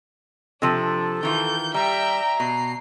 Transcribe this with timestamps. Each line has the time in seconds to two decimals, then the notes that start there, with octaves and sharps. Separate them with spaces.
0.62 C3 F3 D4 A4
1.23 D#3 E3 F4 G6
1.74 G3 E5 G5 A#5
2.40 B2 C7